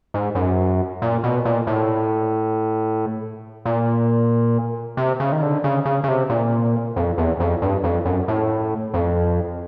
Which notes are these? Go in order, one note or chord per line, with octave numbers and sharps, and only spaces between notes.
G#2
F#2
A#2
B2
A#2
A2
A#2
C3
C#3
D#3
D3
C#3
C#3
C#3
C3
A#2
F2
E2
F2
G2
F2
F#2
A2
F2